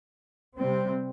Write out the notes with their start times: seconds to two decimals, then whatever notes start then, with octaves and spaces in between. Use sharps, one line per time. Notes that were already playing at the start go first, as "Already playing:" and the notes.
0.57 C3 G3 C4